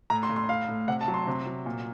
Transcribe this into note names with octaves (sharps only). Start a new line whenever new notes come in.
A2 A#5
C6
A2
C6
A2 F5
A2
C3 F#5
A5
F#3
C6
C3
F#3
A#2